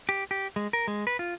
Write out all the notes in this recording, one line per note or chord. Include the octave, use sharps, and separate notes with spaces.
G4
G4
G#3
A#4
G#3
B4
F4